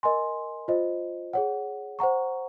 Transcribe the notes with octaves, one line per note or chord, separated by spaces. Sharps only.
A#4 D#5 G#5 C6
F4 C5 D#5
G#4 C#5 F#5
C5 F#5 A#5 C#6